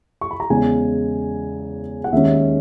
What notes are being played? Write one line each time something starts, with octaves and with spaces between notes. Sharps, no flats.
C#6
B5
A#5
E2 C#3 G#3 G#5
F#5
D#2 D#3 G#3 C#4 E5